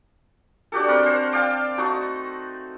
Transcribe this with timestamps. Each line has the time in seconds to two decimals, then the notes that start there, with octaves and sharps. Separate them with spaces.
0.72 D4 F#4 G4 A4
0.88 C4 A#4 F#5 B5
1.04 A#4 C5 A5
1.33 D5 F5 G5 A5
1.78 A3 D#4 F#4 A4